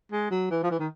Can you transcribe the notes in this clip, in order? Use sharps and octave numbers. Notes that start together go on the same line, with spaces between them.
G#3
F#3
E3
F3
E3
D#3